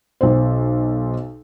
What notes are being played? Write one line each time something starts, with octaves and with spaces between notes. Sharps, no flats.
B1 C5